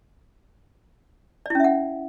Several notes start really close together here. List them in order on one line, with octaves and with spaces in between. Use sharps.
D5 E4 C#4 E5 F#5